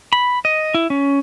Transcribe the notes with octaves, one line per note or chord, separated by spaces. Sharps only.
B5
D#5
E4
C#4